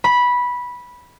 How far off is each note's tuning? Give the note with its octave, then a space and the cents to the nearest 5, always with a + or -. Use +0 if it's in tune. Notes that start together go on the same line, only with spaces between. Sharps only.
B5 -10